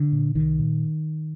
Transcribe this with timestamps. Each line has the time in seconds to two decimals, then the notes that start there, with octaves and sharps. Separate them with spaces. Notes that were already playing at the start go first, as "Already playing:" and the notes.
Already playing: D3
0.12 A#2
0.35 C2 D#3
0.59 A#2